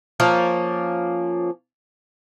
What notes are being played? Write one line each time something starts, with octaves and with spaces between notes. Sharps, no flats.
F3 A#3 C#4